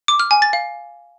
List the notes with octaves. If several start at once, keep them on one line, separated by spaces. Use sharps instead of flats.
D6
F6
G#5
A6
F5